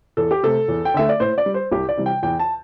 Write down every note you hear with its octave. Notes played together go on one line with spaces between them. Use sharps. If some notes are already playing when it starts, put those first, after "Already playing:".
E2 A4
G4
C3 A3 A4
E2
G5
D3 A3 E5
D5
A2 C5
D5
G3
C5
C2 G4
D5
C3 E3 G3
G5
E2 G5
A5